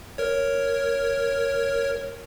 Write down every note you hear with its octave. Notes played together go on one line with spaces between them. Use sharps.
A#4 C#5